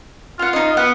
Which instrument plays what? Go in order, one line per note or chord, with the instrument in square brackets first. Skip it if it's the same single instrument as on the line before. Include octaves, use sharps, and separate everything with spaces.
[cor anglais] F4 [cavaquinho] F5 F#5
[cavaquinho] D#4 D#5
[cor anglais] B3 [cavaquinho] F#5